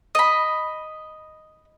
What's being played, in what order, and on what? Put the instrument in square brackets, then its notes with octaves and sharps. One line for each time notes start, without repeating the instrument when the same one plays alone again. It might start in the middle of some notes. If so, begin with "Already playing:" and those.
[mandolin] D#5 B5